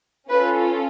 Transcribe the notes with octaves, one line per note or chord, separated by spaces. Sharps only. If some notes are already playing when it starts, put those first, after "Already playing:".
C#4 F4 A4 B4